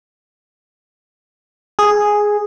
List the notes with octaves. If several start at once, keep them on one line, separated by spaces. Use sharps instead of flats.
G#4